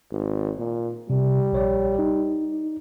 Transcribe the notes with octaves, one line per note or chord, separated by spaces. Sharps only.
G#1
A#2
C3 G3
A#1 C#5 D5
D#4